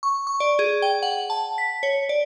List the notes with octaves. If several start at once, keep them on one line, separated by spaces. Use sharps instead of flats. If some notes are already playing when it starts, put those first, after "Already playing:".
C#6
C#6
D5
G#4
G5
F#5
A5
B6
C#5
D5